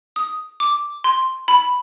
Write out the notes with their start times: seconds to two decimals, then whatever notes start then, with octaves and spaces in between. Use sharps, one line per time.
0.16 D#6
0.60 D6
1.04 C6
1.48 B5